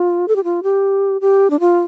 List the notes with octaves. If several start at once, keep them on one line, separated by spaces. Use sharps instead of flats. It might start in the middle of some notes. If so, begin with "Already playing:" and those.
Already playing: F4
A4
G4
F4
G4
G4
D4
F4